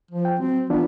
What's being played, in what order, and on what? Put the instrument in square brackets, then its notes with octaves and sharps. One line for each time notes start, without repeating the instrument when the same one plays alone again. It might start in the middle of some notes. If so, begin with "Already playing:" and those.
[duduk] F3
[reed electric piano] G5
[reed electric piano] F#3 [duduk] C4
[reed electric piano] E3 D4 F4 [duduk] B3